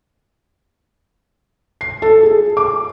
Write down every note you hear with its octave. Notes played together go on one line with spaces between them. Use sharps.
C7
A4
G#4
D6